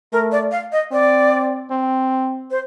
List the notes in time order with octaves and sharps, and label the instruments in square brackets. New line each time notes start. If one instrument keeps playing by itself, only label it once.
[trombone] A3 [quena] A#4
[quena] D5
F5
D#5
[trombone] C4 [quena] D5
[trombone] C4
[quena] C5